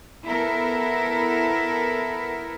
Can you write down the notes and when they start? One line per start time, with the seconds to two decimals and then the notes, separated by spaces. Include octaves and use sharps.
0.24 B3 E4 A4 A#4